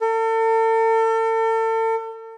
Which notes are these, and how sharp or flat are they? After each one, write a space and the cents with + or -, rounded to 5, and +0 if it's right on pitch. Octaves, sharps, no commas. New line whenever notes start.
A4 +40